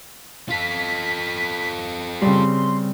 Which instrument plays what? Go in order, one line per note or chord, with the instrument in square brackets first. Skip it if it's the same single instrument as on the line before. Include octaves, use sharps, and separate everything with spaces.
[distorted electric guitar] F4 A4 [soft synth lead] B6
[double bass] C#3 C4 [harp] G3 [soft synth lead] C6